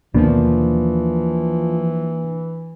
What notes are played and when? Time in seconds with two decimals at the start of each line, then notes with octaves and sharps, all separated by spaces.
0.15 D#2 B2 E3 F3 A#3 D4